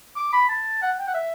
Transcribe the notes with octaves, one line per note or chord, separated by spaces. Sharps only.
D6
B5
A5
F#5
G5
F#5
E5